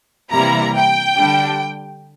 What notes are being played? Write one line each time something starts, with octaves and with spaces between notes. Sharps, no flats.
C3 E3 G3 A#3 E4 A#5
G5
D3 G3 D4